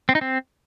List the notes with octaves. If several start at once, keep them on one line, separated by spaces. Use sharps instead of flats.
C4
D#4
C4